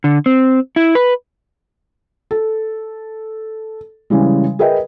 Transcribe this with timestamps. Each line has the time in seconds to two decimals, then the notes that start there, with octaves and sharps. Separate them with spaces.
0.04 D3
0.26 C4
0.76 E4
0.95 B4
2.31 A4
4.10 C#3 E3 G3 G#3
4.59 G#4 A#4 B4 D#5 E5 G5